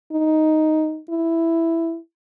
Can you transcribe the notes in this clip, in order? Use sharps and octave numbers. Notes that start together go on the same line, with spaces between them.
D#4
E4